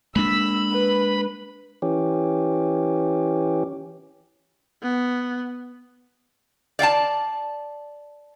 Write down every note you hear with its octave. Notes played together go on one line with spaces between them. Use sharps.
G#3 A#3 D4 B5 E6
B4
E3 C#4 G4
B3
D5 F5 G5 A5